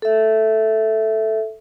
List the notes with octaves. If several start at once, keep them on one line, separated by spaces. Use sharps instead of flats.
A4 E5